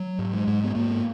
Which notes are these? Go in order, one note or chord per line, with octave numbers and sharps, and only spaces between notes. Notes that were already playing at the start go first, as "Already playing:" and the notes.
Already playing: F#3
G#2
G#3
G#2
B3
G#2 A#3